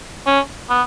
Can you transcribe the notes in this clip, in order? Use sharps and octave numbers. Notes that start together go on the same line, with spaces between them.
C#4
B3